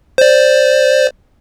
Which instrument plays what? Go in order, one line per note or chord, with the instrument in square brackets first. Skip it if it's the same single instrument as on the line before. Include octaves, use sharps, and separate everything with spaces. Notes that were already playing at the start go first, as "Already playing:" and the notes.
[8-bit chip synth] C5 D5